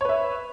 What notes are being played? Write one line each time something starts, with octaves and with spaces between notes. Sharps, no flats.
B4 C#5 E5